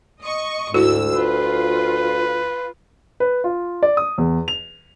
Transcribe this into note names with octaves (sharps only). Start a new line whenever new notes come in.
D#5 C#6
D2 G#2 E4 F#4 E6
F4 B4
B4
F4
D5
D#6
E2
F7